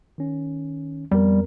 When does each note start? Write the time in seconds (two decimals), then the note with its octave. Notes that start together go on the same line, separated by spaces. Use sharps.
0.18 D#3 C#4
1.11 F2 G3 B3 A#4